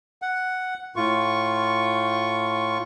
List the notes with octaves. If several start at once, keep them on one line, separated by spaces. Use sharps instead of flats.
F#5
A2 F4 C#6